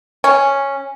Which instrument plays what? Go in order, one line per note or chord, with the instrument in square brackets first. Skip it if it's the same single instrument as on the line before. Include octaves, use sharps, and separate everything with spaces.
[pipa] C#4